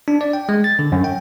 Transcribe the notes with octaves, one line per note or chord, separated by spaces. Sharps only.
D4
D5
G5
G#3
A6
D3
F#2
G5